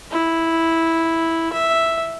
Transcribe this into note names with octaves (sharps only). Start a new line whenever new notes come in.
E4
E5